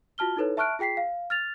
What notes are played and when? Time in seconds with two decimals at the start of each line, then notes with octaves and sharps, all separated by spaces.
0.18 F4 F#4 A5 F6 G7
0.37 D#4 E4 A4 B4 C#5
0.57 E5 A5 C#6 F6 F#6 D7
0.79 F4 G#4 G5 B6 C7
0.97 F5
1.30 F6 A6 F7